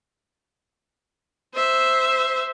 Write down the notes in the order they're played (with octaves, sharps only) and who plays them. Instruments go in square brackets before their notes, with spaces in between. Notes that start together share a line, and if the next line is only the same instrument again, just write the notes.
[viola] C5 E5